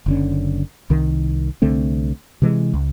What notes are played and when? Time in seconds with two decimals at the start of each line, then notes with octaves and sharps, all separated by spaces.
0.06 F#1 D3 C#4
0.90 C2 D#3
1.62 C2 D3 A3 C4
2.42 C3 E3 G#3
2.74 C#2